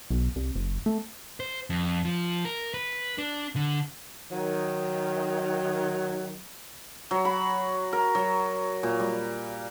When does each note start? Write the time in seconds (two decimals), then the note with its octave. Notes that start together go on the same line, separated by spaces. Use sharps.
0.10 B1
0.36 C2
0.55 F#1
0.86 A3
1.40 C5
1.70 F2
2.05 F3
2.45 A#4
2.74 B4
3.18 D4
3.56 D3
4.31 D#3 F#3
7.11 F#3
7.25 B5
7.93 A#4
8.15 F#3
8.83 A#2
9.00 G3